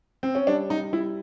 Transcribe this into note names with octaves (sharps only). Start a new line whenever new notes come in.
C4
C#4
G3 D4
G3 D#4
G3 E4